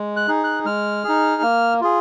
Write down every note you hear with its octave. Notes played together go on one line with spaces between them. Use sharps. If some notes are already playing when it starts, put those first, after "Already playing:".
Already playing: G#3
F#6
D#4 G#4
F#6
G#3 F6
D#4 G#4
A#3
F4 G#4